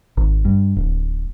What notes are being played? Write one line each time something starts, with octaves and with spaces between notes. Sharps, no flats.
G#1
G2
D1